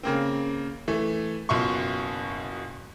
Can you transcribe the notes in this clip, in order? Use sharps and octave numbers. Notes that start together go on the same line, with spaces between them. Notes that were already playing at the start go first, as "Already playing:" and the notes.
C#3 A#3 C4
E3 A3
F#1 B2 F4 E5 C6 C#6